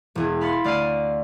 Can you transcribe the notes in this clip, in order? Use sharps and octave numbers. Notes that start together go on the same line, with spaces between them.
E1 E2 G#4
F5 B5 C6 A6 C#7
D2 D5 F6 C7 D#7